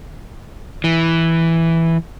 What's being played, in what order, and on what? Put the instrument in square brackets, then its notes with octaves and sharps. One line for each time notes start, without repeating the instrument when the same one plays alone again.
[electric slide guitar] E3